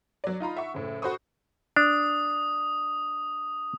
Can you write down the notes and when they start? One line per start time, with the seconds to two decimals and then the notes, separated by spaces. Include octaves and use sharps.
0.24 F#3 D5
0.40 D#4 F4 A#5 B5
0.57 E5 F#5 C#6
0.74 F#1 A2
1.02 F#4 A4 C5 B5 C#6 D#6
1.76 D4 D#6